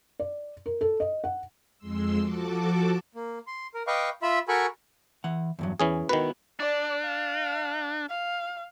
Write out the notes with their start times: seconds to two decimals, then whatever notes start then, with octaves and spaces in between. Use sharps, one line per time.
0.19 D5
0.66 A#4
0.81 A4
1.00 D#5
1.24 F#5
1.78 F2 G#3 C6 E6
2.20 F3 F#4 A4 A5 D6
3.15 A#3
3.47 C6
3.74 A#4
3.87 B4 D#5 F5 G5 C#6 D6
4.22 F4 E5 B5 E6
4.48 F#4 A4 A#4 G#5 B5 C#6
5.24 E3 F#5
5.59 E2 G2 F#3
5.80 E2 E3 C#4 G#4
6.09 D#3 B3 E4 F#4 B4
6.60 D4 D5
7.01 F5
8.10 F5